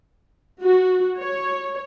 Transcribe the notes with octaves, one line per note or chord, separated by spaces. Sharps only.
F#4
C#5